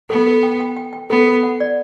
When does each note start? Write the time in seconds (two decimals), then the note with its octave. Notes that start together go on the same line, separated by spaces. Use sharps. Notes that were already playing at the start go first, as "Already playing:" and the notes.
0.10 B3 A4
0.27 A4
0.43 G5
0.60 G5
0.76 G5
0.93 G5
1.10 B3 A4
1.27 A4
1.43 F#5
1.60 D5